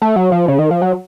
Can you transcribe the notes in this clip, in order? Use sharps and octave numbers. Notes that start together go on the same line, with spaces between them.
A3
F#3
F3
C#3
D#3
F3
F#3